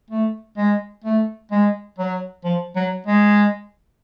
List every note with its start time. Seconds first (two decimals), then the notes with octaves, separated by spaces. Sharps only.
0.11 A3
0.57 G#3
1.04 A3
1.51 G#3
1.99 F#3
2.44 F3
2.76 F#3
3.07 G#3